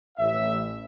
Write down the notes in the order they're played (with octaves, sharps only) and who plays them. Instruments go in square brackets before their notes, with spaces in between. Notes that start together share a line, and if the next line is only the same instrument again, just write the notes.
[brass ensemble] A1 E5